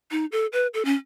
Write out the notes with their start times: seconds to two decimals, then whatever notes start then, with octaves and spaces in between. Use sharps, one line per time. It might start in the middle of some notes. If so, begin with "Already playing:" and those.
0.11 D#4
0.32 A4
0.52 B4
0.74 A4
0.85 C#4